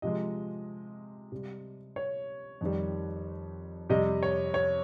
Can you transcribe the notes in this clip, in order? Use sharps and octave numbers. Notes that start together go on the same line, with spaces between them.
C3 F3 G#3 D#5
C3 G3
C#5
F2 D#3 G3
F2 C3 G3 D#5
C#5
C#5